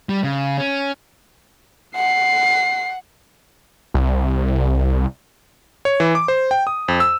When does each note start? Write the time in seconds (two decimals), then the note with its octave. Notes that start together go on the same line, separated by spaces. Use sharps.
0.09 G3
0.24 C#3
0.58 C#4
1.96 F#5 C7
3.94 C2
5.85 C#5
6.00 E3
6.15 D6
6.28 C5
6.51 G5
6.67 D#6
6.88 F2
7.00 E6